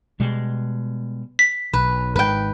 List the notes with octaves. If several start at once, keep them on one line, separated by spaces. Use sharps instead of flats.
B2 G3 G#3
B6
B1 B4
G#1 G#2 B4 G5